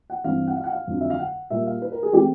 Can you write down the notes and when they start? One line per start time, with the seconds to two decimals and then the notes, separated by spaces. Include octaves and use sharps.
0.10 F#5
0.24 G2 E3 G3 C4 F5
0.47 F#5
0.57 F5
0.64 F#5
0.72 F5
0.87 F2 D3 F#3
1.01 E5
1.10 F5
1.19 F#5
1.50 A#2 G3 A#3 E5
1.66 F5
1.82 B4
1.92 A#4
2.03 G#4
2.13 E3 A3 C4 G4